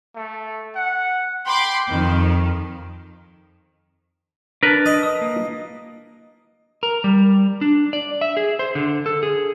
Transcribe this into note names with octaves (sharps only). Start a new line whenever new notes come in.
A3
F#5
G5 B5 C6 D6
F2 D#3
D4 A#4 B4 A5
D#5
D#6
A#3
A#4
G3
D4
D5
E5
G#4
C5
D3
A4
G#4